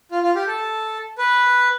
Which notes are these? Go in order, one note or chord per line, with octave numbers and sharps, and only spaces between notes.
F4
F4
G4
A4
B4